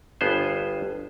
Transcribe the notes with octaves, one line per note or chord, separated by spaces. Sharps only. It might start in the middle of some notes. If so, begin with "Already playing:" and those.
G1 G2 B3 G#4 C5